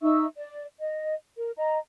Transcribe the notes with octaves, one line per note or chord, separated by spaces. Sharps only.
D#4 E5 C#6 E6
D5
D#5
A#4
D#5 A#5